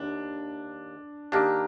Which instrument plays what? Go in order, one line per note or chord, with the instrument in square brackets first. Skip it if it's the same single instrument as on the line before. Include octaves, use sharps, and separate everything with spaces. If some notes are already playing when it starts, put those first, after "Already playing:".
Already playing: [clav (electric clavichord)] D#2 [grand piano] D4
[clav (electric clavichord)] D#3 A#3 D4 [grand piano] G4